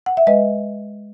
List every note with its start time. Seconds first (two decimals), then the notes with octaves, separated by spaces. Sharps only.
0.06 F#5
0.17 E5
0.27 G#3 B4 D#5